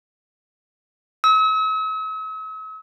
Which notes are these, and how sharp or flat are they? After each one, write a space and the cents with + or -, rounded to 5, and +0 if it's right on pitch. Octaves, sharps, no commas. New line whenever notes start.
E6 -45